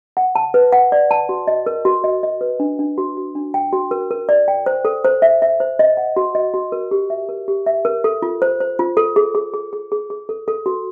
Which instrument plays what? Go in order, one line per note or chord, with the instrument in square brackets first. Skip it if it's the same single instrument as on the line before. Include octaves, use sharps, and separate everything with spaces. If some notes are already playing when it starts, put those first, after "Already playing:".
[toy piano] F#5
A5
B4
F#5
D5
A5
F#4
D#5
A#4
F#4
D#5
D#5
B4
D4
D4
F#4
F#4
D4
G5
F#4
A#4
A#4
D5
G5
C5
A4
C5
E5
E5
C5
D#5
F#5
F#4
D#5
F#4
A#4
G4
E5
A#4
G4
E5
A#4
A4
F4
C5
C5
F4
A4
G#4
G#4
G#4
G#4
G#4
G#4
A4
A4
F#4